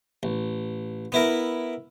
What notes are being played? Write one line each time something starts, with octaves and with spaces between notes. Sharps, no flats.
A1
B3 E4 A#4